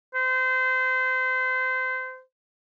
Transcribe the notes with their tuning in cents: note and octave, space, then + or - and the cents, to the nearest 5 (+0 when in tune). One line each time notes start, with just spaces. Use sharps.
C5 -30